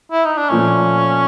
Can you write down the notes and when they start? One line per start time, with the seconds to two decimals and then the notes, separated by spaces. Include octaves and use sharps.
0.12 E4
0.25 D#4
0.37 D4
0.49 A#2 F3 A3 C#4